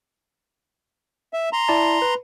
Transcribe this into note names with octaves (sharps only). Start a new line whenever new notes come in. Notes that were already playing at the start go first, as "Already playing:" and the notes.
E5
A#5 C6
E4 D5 A5
B4